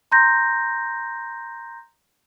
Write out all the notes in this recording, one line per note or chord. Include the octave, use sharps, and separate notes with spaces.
A#5 C6 G6 A#6